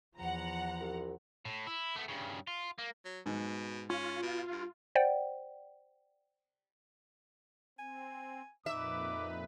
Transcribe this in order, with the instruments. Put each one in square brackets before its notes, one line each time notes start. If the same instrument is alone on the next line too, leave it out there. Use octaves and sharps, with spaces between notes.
[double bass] E2 F3 [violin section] F#5 A#5
[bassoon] C2
[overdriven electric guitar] A2
E4
A3 B3
G2 C#3
F4
A#3
[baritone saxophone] F#3
[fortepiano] G#2 [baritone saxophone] B2
[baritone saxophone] C#4 [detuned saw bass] F4
[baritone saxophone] B2
G2
[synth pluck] C5 D5 F#5 G5
[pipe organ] C4 [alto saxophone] G#5
[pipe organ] F2 A#2 B4 [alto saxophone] D#4 [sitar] E5 [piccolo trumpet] D6